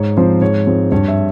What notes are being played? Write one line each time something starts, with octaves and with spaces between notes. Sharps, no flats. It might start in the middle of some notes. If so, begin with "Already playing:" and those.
Already playing: G#2 C#5
F3 C4 C5
G#2 C#5
F3 G#3 C4
G2 C#5
E5